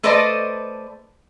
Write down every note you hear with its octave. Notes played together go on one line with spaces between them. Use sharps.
A3 A4 B4 C5 D5 D#5